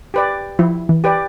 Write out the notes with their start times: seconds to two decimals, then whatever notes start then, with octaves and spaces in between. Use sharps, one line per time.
0.14 G4 B4 D5
0.59 F3 E4
0.89 E3
1.04 G4 B4 D5